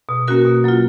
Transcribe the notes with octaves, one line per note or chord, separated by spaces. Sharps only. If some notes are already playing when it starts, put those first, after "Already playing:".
B2
A#3 C#4 F#4 A#4
B2
F#3 A#3 F4